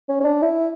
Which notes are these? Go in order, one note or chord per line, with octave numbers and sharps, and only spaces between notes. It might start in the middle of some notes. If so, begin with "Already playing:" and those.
C#4
C#4
D4
E4